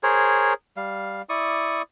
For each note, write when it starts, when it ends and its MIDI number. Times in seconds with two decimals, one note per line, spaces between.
0.03 0.53 68
0.03 0.53 70
0.03 0.53 72
0.03 0.53 73
0.77 1.22 55
0.77 1.22 77
1.29 1.82 64
1.29 1.82 74
1.29 1.82 85
1.29 1.82 87